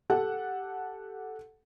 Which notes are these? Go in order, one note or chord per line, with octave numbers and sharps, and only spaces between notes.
G4 A4 F#5